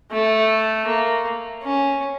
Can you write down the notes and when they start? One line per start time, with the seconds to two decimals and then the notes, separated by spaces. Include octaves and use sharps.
0.11 A3
0.87 A#3
1.63 C#4